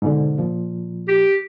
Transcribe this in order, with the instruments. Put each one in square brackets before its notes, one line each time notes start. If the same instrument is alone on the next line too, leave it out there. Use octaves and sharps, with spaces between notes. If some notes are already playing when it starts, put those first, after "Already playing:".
[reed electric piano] G#2 B2 D3
A#2 F3
[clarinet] G4